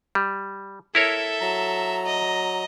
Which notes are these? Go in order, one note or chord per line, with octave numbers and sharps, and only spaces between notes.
G3
E4 A4 A#4 C#5 E5
F#3 A#5
D#5